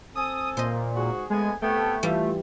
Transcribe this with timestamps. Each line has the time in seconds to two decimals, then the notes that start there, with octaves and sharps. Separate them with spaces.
0.15 C4 A4 G#5 D#6
0.57 A#2 C5 D#5
0.96 G#2 F#4 G#4
1.30 G#3 A3 B3 G#5
1.62 C3 A3 B3 G5
2.03 E3 G3 F4